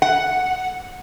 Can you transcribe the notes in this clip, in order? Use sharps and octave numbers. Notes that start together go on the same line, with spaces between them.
F#5